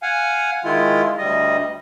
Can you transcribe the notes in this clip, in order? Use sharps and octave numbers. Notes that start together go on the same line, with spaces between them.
F5 F#5 G#5
D#3 G#3 E4 F4
D2 G3 D#5